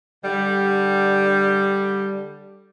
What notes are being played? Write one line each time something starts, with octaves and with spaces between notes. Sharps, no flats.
D3 G3